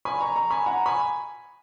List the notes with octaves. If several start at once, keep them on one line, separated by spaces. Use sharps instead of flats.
G#5 B5
A#5 C#6
A#5 C#6
G#5 B5
F#5 A#5
G#5 B5